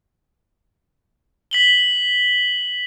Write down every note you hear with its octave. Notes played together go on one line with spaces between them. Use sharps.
B6 F#7 G7